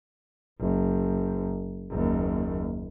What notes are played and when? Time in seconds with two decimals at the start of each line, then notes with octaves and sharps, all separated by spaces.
0.60 F#1
1.90 F#1 D#2